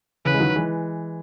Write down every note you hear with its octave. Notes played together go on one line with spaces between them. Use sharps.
C#3 E3 B4
G#3
D#3 F#3
E3 G#3